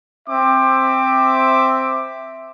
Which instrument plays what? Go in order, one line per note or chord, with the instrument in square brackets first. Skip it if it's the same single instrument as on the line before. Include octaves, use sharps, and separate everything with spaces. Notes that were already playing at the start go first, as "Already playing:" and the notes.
[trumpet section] C4 E5 D6